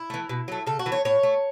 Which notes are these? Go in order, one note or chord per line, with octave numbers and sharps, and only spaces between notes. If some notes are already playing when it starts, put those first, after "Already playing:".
Already playing: E4
E3 A3
B2
F#3 A3
C#3 A4
F#4
E3 A3
C#5
A2 C#5
A3